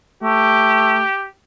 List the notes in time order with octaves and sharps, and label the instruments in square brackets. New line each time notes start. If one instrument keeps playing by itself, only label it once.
[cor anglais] A3 [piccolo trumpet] G4